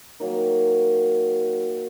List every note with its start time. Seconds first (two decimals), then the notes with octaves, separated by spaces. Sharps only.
0.20 D#3 F#3 A#3